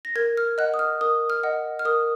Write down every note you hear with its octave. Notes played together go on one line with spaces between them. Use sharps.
A#6
A#4 G#6
F6
D#5 F#5 F#6
D#6
F6
A#4 D#6
F6
D#5 F#5
F6
A#4 D#6